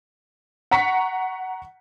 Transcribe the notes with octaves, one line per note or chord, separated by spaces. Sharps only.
F#5 A#5 C#6 B6 C#7